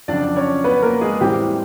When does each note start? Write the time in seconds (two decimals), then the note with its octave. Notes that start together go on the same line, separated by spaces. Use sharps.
0.08 F2 C#3 F#3 D4 D5
0.36 C#4 C#5
0.64 B3 B4
0.82 A#3 A#4
1.01 G#3 G#4
1.20 A2 E3 G3 C4 E4 G4